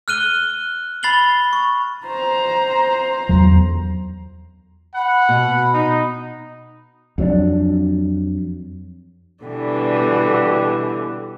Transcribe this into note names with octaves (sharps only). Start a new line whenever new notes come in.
F6 F#6 D#7 G7
B5 A6 C7 F#7 G7
C#6
C5 A#5
E2 F#3
F#5 B5
B2
D#4
F2 F#3 G3 D4
B2 D3 E3 G3